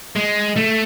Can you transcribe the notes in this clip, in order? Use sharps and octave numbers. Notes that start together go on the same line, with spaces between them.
G#3
A3